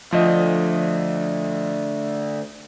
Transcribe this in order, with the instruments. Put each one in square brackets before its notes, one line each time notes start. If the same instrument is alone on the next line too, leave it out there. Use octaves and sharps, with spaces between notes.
[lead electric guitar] D2 [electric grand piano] F3 D#5